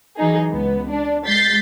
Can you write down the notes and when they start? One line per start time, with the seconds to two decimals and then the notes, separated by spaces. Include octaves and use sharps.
0.17 E3 F#3 D#4 G#4
0.50 C#2 B3
0.90 D4
1.27 G#3 G6 A6 B6 C7